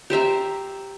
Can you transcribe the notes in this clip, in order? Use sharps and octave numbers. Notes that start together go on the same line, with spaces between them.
G4 C5 E5 A#5